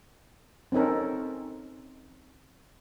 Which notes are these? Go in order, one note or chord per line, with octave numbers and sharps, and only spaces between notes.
C4 C#4 D#4 A4 A#4